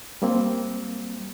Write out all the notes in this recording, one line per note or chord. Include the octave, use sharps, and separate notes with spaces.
G3 A#3 C4